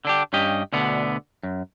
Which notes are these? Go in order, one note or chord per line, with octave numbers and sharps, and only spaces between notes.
D3 D4 G4
G2 C#4 G4 D#5
D2 B2 D3 B3
F#2